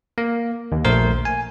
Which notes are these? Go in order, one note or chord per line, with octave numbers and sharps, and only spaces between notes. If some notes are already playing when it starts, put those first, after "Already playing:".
A#3
D#2
A#1 A3 A#4 C5 C6
G#5